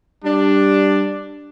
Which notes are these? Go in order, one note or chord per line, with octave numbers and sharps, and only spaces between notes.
G3 D4